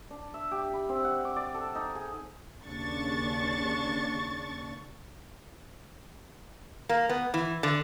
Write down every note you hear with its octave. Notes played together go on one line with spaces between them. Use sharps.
D4
E5
G4
B5
C4
F#5
D6
D5
A4
D#4
G#4
D#2 C#3 D4 C#6 A6
A#3
B3
E3
D3